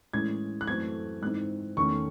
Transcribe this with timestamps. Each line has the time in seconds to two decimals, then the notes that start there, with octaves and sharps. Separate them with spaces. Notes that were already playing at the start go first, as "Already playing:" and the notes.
0.13 A2 E3 G#3 C#4 G#6
0.61 F#6
0.67 F#2 E3 A3 C4 G#6
1.22 G#2 E3 C4 D#4 F#6
1.77 E2 D#3 A3 C#4 C#6